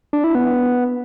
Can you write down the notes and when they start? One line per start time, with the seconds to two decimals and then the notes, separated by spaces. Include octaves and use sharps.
0.13 D4
0.24 E4
0.35 B3